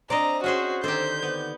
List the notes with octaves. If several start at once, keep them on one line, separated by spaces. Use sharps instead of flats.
C4 D4 D5 D#5 A#5
C#4 F#4 G#4 C5
D3 D#3 C4 G4 C5 G6
B3